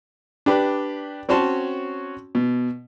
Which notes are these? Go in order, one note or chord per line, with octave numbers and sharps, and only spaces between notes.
D4 G4 B4
C4 C#4 F#4 C#5 A5 C6
B2